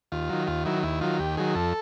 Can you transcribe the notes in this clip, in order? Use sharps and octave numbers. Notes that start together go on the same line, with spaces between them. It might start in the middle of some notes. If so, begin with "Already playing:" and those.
D#2 F4
D#3 F#3
D#2 F4
D#3 F#3 E4
D#2 E4
D#3 F#3 F4
D#2 G4
D#3 F#3 G#4
F2 A4